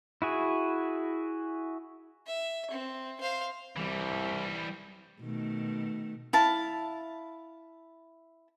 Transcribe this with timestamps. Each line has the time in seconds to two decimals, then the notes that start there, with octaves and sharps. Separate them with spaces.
0.22 E4 F#4 G#4
2.27 E5
2.71 C4
3.21 C5 F5
3.77 C2 E3 G3
5.22 B2 D#3 A3
6.33 E4 F5 A5